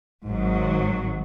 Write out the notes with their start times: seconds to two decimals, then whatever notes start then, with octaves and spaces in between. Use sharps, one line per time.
0.25 G#1 G#2 F#3